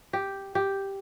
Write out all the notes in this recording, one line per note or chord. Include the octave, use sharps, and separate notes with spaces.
G4
G4